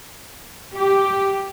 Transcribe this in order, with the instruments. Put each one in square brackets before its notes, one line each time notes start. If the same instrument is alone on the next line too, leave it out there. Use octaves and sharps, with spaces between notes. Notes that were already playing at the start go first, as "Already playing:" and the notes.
[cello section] G4